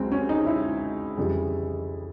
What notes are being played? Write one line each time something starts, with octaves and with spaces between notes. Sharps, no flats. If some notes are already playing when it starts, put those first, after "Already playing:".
Already playing: C#2 C#3 F#3 C4 C#4
C#4
D#4
E4
F2 C#3 E3 G3